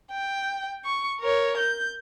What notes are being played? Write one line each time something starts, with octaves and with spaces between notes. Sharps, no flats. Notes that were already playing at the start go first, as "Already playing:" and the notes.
G5
C#6
A#4 C#5
G6